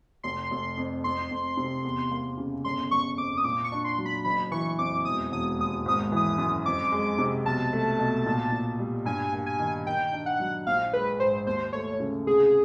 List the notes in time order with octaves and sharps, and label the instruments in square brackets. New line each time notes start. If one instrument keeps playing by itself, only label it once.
[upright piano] F1 [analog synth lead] C6
[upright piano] F1
F2
[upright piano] F2 [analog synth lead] C6
[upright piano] F2
C3
E2
A#3
C#3
[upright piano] G1 [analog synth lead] C6
[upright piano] G1 [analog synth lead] C#6
[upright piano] F2 [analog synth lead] D6
[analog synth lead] D#6
[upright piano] A#2 [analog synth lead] D6
[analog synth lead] C#6
[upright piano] D4
[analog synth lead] C6
[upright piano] F#3
[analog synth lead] B5
[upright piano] F#1 [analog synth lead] B5
[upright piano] E3 [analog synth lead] C#6
[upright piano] F2 [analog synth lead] D6
[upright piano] E1 [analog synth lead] D#6
[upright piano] E1 [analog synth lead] D#6
[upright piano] D#2 [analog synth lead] D#6
[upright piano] G#1 [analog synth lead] D#6
[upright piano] E3 [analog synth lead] D#6
[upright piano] F#2
[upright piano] F2 [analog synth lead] D6
[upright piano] G#3
C3
[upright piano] B1 [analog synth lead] A5
[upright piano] A3
B2
A#2
A#2
G3
[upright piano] G2 [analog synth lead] G#5
[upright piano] A#3
[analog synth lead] G#5
[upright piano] D#3
[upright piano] D#3 [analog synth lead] G5
[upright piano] D4
[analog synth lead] F#5
[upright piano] F#3
[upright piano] A#1 [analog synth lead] F5
[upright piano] G#3 [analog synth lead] B4
[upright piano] G#2 [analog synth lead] C5
[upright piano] D#2 [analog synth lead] C5
[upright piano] A3 [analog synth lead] C#5
[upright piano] C#3
[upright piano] C2 [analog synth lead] G#4